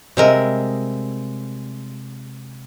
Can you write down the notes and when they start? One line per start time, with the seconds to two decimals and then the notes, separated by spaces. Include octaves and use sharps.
0.17 C3 G3 G#3 A#4 D#5 E5